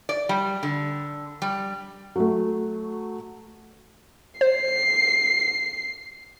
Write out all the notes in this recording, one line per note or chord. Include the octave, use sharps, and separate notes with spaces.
D5
G3
D3
G3
F#3 A3
C5 C7